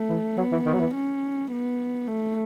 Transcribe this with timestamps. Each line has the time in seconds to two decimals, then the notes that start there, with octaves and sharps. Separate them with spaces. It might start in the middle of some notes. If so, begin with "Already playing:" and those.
Already playing: A3
0.09 E3
0.37 F#3 B3
0.52 E3
0.66 D#3
0.74 F#3
0.80 E3
0.95 C#4
1.51 B3
2.07 A3